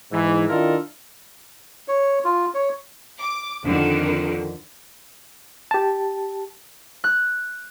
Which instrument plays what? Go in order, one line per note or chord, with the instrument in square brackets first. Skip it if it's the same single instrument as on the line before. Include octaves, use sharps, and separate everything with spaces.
[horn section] G#2 E3
D#3 D4 E4 F4 A4 A#4
[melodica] C#5
F4
C#5
[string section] D6
F2 D3 D#3
[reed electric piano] G4 A5
[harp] F#6